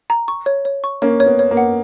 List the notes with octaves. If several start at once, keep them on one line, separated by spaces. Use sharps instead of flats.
A#5
C#6
C#5
C#5
C#6
A#3 C#4 C#5
C#5
B3
C#5
A#3
F#5